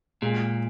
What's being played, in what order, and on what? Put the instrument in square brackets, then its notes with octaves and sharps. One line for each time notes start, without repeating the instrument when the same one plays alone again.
[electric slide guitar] A#2 [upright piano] G#3